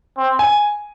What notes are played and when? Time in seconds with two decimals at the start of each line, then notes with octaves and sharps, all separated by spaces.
0.18 C4
0.39 G#5